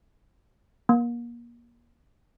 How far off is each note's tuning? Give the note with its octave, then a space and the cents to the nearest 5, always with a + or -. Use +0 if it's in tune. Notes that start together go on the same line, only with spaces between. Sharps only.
A#3 +30